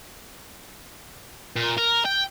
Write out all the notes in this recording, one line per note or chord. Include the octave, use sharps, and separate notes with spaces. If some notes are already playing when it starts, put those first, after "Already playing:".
A#2
A#4
G5